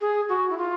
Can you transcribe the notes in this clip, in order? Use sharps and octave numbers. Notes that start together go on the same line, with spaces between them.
G#4
F#4
E4
F4